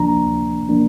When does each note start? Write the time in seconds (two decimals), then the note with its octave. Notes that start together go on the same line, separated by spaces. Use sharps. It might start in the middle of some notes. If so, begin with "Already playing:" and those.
Already playing: D2 C3 F3 A#3 D4 A#5
0.24 D2
0.69 C3 F3 A#3 D4